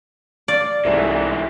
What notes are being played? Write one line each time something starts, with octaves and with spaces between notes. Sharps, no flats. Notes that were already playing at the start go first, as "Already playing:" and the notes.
D5 F5
C2 G#2 D3 E3 A3 E5